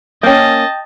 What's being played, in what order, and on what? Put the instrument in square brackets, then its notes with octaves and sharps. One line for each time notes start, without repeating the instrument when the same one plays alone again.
[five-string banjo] A#3 C#4 [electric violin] D#5 A5 [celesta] G5 G6